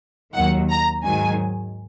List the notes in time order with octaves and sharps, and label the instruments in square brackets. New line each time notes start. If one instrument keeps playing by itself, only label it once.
[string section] D#2 D#3 F#3 F#5
A#5
G#2 D#3 F#3 G#5